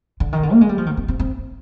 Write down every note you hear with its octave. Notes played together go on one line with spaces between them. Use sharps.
D3
D#3
D3
A#3
G#3
G3
F3
D#3
C4
C4
C4